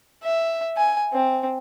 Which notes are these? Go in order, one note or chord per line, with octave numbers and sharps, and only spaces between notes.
E5
G#5
C4